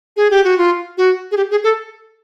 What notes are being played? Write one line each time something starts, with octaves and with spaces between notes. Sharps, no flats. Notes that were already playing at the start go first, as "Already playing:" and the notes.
G#4
G4
F#4
F4
F#4
G#4
G4
G#4
A4